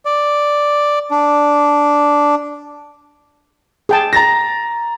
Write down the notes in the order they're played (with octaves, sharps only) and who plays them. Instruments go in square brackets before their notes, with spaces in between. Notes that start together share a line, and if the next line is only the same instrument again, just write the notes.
[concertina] D5
D4
[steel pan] G#4 G5 A5
[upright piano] A#5 A6 A#6